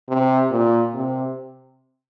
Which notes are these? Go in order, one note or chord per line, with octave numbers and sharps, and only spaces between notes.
C3
A#2
C3